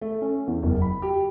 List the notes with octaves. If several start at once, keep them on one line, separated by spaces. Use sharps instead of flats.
A3
C#4
E2
F#1
B5
G4